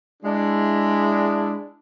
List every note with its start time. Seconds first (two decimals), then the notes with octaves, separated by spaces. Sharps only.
0.23 G#3 D4 E4